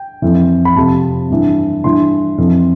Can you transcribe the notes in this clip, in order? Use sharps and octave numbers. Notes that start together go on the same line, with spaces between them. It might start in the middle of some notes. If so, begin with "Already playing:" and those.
Already playing: G5
F2 E3
B5
F2 C3 F3 A5
G2 E3
G2 E3 C6
F2 E3